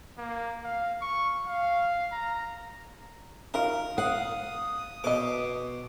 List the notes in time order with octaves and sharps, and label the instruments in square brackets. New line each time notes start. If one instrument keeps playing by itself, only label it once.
[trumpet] A#3
F5
C#6
F5
A#5
[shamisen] D#4 F4 F#4 [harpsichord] A#4
[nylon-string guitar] F5 [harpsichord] F#5 [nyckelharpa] D#6
[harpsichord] B2 D6 [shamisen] C5 D#5